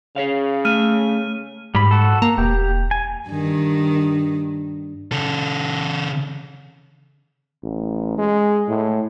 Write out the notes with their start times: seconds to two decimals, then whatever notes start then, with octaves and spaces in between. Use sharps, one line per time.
0.16 C#3 G#4 C#5 F5
0.65 A3 F6 D#7
1.75 G#2 G3 B5
1.91 F#4 A4
2.22 A#3 A#5
2.38 E1 G4
2.91 G#5
3.29 G2 D#3
5.12 C#3 A4
7.63 A1
8.18 G#3
8.68 A2